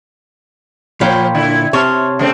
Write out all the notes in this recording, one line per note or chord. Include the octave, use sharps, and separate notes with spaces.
A#2 F3 C5 C#5 F5 G5 B5
D3 E4
C3 C#5 A5 C6 F6
C#3 A3 C4